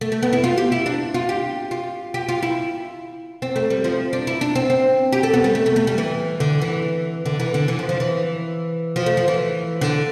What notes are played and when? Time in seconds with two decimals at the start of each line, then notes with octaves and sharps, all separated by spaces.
0.01 A3
0.12 A3
0.23 B3
0.33 E4
0.44 F4
0.58 G4
0.72 E4
0.86 D4
1.14 F4
1.29 G4
1.71 F4
2.14 G4
2.29 F4
2.43 E4
3.42 C4
3.56 A3
3.70 G3
3.84 F3
4.13 D4
4.27 E4
4.41 D4
4.55 C4
4.70 C4
5.12 G4
5.23 A4
5.34 B3
5.44 G3
5.55 A3
5.66 A3
5.76 A3
5.87 G3
5.98 E3
6.40 D3
6.62 E3
7.26 D3
7.40 E3
7.54 D3
7.68 E3
7.79 F3
7.89 F3
8.00 E3
8.96 F3
9.06 A3
9.17 F3
9.28 E3
9.81 D3